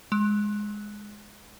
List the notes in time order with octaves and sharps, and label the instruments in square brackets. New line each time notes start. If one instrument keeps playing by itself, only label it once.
[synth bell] G#3